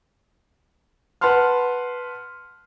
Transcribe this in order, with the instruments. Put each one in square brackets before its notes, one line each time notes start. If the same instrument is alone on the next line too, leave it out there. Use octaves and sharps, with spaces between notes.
[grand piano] B4 F#5 A5 C6 F6